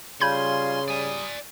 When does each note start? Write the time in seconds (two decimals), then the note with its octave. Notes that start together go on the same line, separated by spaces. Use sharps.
0.21 C#3 G3 F4 G#5 B5 C6 G6 G#6
0.88 G3 D5 G#5 D#6